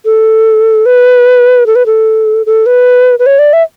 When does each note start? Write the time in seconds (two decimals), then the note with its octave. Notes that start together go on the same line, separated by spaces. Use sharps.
0.05 A4
0.86 B4
1.66 A4
1.75 B4
1.86 A4
2.46 A4
2.66 B4
3.19 B4
3.26 C#5
3.39 D5
3.53 E5